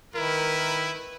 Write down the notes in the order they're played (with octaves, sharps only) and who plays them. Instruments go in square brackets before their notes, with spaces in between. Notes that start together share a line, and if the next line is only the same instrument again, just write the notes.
[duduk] D#3 [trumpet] E4 [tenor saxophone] A#4 [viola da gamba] B4